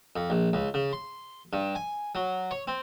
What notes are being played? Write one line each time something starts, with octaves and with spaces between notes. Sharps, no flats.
F2
A#1
C#2
C#3
C6
G2
G#5
F#3
C#5
C4